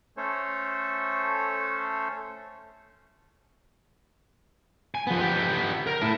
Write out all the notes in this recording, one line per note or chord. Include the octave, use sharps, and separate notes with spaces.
A3 C#4 A4 C5 C#5
G#5
F3 B3
B3 G4
A#4
A3 E4